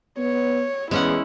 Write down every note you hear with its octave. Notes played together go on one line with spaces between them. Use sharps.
B3 C#5
E2 G#3 C#4 E4 F#5